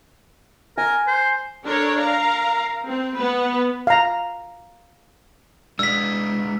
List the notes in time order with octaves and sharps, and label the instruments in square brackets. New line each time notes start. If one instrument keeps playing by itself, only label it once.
[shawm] A#4 [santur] G#5
[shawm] C5
[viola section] D4 A4 A#4 C#5
A#4 F5 A#5
C4
B3 B4
[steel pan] F5 A#5
[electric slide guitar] G#3 D4 [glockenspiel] E6 B6